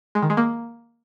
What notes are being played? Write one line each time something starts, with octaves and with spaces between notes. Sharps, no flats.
G#3
D#3
G#3
A#3